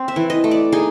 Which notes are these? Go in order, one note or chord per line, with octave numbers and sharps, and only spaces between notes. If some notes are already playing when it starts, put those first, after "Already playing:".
Already playing: C4
E5
E3
D#5
A3
D5
D#4 G#4